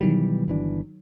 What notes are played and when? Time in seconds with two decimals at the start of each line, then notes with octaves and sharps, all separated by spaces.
0.01 B2 D#3 E3 F#3 G3
0.48 G1 E3 D4